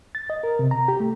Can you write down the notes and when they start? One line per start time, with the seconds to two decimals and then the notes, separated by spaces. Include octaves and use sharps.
0.15 A6
0.30 D#5
0.43 A#4
0.59 C3
0.71 A#5
0.88 G4
1.00 A3